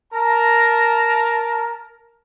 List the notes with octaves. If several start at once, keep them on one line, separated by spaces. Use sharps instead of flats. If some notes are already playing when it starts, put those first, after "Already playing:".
A#4 A5 A#5